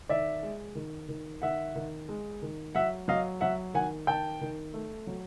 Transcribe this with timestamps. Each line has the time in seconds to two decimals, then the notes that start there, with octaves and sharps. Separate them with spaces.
0.09 D#3 D5 E5
0.43 G#3
0.75 D#3
1.08 D#3
1.42 D#3 E5 F#5
1.75 D#3
2.09 G#3
2.42 D#3
2.75 F#3 E5 F#5
3.08 F#3 D#5 F5
3.41 F#3 E5 F#5
3.74 D#3 F#5 G#5
4.07 D#3 G5 A5
4.41 D#3
4.74 A3
5.07 F#3